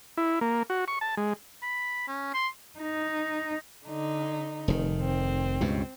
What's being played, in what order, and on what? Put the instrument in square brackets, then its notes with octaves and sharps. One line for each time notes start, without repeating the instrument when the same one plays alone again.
[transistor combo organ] E4
A#3
F#4
C#6
A5
G#3
[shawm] B5
C#4
C6
[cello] D#4
[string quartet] D3 D#4
[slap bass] F1 D#3
[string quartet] C4
[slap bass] C#2 G2 B2